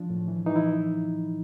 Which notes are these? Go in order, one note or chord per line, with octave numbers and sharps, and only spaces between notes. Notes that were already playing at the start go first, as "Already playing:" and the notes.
Already playing: F3 D4
A2
E3
E3 D#4
E4